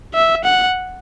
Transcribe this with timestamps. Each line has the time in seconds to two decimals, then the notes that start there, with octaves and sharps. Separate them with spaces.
0.14 E5
0.44 F#5